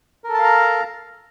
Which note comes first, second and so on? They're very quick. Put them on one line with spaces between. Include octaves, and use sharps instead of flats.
A#4 A4 A5 F5 A#5